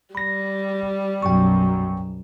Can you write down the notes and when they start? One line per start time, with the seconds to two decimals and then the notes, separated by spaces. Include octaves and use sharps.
0.15 G3 B5 A#6
1.22 B1 F#2 G5 C#6